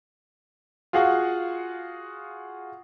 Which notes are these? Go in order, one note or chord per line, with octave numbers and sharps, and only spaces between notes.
F4 F#4 G#4 F5 F#5 C#6